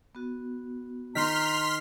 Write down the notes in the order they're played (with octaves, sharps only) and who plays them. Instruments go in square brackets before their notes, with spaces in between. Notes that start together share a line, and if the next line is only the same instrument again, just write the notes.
[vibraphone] B3 F#4
[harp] D#3 [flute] A#5 [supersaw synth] C6 F6 B6